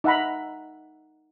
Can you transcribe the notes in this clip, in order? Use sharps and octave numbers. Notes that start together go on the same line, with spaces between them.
D#4 E5 F#5 A#5 B5